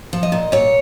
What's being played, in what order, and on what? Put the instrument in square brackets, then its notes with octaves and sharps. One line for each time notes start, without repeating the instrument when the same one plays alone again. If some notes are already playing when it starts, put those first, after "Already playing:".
[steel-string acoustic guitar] F3
D#5
A#2
A#2 C#5